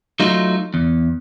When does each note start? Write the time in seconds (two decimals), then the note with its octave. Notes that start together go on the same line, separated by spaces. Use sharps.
0.20 F#3 A3 D#4 F4
0.74 E2